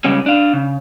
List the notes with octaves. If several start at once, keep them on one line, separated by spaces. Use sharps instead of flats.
C#3 G3 G#3 C#4
D4 F5
C#3